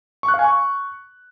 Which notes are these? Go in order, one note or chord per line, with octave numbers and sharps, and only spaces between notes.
C#6
F#6
F5
G#5
C#6